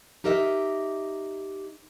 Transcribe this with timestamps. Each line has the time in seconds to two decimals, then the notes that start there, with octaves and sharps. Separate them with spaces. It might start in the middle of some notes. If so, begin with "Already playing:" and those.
0.24 D#4 G4 A#4 D#5 E5